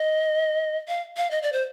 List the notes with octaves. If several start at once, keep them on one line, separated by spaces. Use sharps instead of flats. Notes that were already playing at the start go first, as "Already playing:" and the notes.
Already playing: D#5
F5
F5
D#5
D5
C5